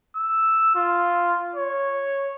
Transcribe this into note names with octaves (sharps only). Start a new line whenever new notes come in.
E6
F4
C#5